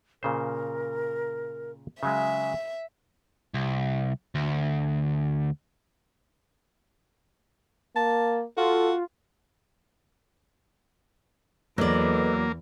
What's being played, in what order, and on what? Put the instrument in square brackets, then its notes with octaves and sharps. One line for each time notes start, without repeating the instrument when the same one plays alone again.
[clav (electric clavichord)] A#2 C#3 C5 [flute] A#4
[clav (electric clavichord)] C#3 F#3 G#3 [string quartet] E5 [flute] G#5
[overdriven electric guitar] C2
D2
[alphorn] A#3 [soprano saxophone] A5
[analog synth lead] F4 [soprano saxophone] F#4 [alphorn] A4
[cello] E2 [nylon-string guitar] F#3 D5 [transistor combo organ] A#3 [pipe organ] A4 B4 D#5